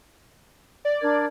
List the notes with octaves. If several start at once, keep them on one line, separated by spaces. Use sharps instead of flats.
D5
D4 A#4 G#6